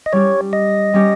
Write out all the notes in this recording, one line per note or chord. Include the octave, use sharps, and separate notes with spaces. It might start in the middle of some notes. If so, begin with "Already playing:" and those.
D#5
G3 C#4 G4 C#5
D#5
G3 C#4 G4